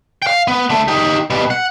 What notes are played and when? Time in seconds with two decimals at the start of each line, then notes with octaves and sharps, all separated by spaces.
0.22 F5 G5
0.48 B3
0.70 D3 A3
0.88 D#4 G4
1.30 B2 G3
1.50 F#5